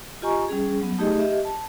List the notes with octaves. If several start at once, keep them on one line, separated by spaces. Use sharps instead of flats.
F4 G4 D#5 G#5 A#5 C#6
G3 C#4 G#4
F#3 B3
A3 D#4 G4 G#4 D#5
G4 D#5 E5
A5